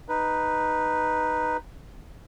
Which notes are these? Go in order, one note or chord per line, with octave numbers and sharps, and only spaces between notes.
D#4 B4